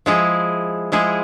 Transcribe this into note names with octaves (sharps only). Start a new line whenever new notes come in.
F3 G#3 E4 G#4
F3 G#3 E4 G#4